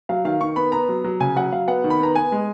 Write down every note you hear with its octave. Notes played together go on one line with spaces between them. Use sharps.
F#3 F5
D#3 F5
D#3 C#6
B3 B5
B3 A#5
F#3
F#3
C#3 G#5
F#3 F#5
F#3 F5
B3 F#5
D#3
B5
B3 A#5
B3 G#5
G#3